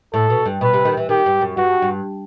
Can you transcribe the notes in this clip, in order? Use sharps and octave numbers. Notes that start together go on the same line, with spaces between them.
A2 A4
B2
G2
B2 B4
C3
D#3
E3
D#3 G4
G2
F#2
G2 F#4
G2